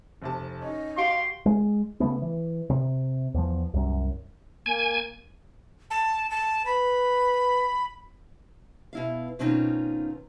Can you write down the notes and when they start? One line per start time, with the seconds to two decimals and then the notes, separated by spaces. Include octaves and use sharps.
0.22 F1 C3 A5
0.62 C#4 D#4 D#5
0.97 F#4 G4 F5 C6 D7
1.46 G#3
2.00 C#3 E3 A3 B3
2.22 E3
2.70 C3
3.34 E2 F3
3.74 C2 F#2
4.66 A#3 G#5
5.90 A5
6.30 A5
6.66 B4 B5
8.93 B2 E4 F5
9.39 B2 D#3 C4 C#4 D#4 F4